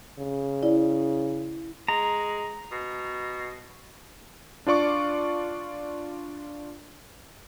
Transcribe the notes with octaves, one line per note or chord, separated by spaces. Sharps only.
C#3
E4 D5
G#3 A#5
B2
D4 F4 D5 C#6 D6